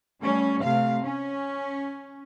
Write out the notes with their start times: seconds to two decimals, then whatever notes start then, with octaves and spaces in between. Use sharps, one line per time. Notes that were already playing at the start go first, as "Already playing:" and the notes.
0.21 G3 A3 C#4
0.62 C3 A3 F5
1.02 C#4